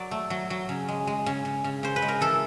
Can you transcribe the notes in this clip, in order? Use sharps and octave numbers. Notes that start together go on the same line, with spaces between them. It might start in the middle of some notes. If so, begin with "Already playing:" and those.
Already playing: F#3 D5
A3
F#3
F#3
C#3
G#3
G#3
C#3
C#3
C#3
C#3 C5
B4
G#3
A#4
E3 A4